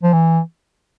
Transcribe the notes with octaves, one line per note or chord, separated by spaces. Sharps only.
F3
E3